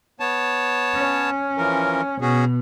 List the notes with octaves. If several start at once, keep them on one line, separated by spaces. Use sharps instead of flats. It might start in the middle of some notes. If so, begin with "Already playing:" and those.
B3 C#5 A5
C#4
E3 F3 A#4
B2 C#4 F#4 G#4